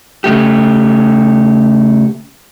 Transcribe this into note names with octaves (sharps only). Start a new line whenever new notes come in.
C#3 A3 G4